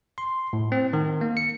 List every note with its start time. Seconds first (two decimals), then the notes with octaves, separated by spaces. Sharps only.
0.18 C6
0.53 A2
0.72 C4
0.93 D#3
1.21 A#3
1.37 C#7